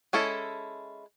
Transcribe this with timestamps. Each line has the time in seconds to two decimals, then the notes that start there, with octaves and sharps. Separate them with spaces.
0.13 G#3 C#4 E4 A4